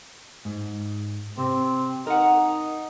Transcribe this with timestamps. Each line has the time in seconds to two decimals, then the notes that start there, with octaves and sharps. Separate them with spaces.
0.45 G#2
1.38 C3 C4
2.07 D#4 A#4 F#5